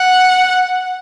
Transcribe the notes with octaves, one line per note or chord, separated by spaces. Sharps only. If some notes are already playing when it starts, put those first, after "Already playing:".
Already playing: F#5